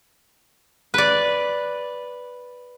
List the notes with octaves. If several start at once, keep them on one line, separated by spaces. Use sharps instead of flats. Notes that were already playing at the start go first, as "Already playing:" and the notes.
B4 D5